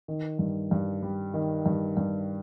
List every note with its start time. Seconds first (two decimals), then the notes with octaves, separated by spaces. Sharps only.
0.08 D#3
0.39 G2
0.71 G2
1.03 G3
1.34 D#3
1.66 G2
1.97 G2